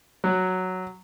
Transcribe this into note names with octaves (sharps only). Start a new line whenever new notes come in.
F#3